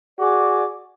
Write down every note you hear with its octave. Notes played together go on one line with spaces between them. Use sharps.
F#4 G#4 D5 D6